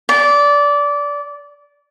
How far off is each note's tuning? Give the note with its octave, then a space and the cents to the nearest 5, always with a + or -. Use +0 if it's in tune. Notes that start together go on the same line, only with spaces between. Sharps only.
D5 -20